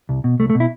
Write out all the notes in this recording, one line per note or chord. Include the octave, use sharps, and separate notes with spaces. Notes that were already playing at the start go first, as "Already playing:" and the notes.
C2
B2
C2 A3
A3
B2
E4